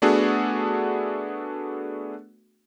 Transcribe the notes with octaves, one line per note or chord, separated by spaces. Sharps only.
A3 B3 D4 F#4 G#4 A4